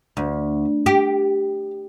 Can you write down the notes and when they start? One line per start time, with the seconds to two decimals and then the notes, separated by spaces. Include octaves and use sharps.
0.17 D2
0.86 G4